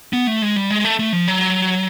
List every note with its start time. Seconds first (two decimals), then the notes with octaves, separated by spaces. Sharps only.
0.13 B3
0.27 A3
0.42 G#3
0.56 G3
0.70 G#3
0.85 A3
0.99 A3
1.13 F3
1.28 F#3